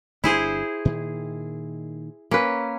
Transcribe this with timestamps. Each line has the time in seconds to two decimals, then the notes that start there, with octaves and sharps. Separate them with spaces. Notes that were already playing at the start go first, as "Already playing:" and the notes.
0.24 G1 D4 E4 G#4 C5
0.85 A#2 D#3
2.31 A#3 C#4 B4